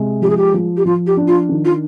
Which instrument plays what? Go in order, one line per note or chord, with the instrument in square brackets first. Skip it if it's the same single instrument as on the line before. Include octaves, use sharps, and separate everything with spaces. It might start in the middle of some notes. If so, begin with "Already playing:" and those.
Already playing: [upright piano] C3 G#3
[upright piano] F3 [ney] G4
[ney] G#4
G4
[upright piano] F3
[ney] G4
[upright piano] F3 [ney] F4
[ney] G4
[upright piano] D4
[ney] F4
[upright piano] D#3
[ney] F4